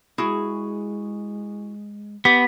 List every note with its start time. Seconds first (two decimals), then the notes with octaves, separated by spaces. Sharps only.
0.18 G#3 E4 F#4 G#4
2.25 B3 G4 B6